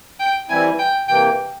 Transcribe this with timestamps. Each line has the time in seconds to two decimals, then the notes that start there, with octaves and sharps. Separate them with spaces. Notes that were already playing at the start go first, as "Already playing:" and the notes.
0.20 G5
0.49 E3 G3 C4 E4 G#5
0.79 G5
1.08 C3 E3 A#3 G5